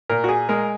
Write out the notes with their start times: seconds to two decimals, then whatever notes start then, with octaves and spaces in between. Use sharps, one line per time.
0.10 A#2 A#4
0.24 F#4
0.29 G#4
0.49 G#3 A#4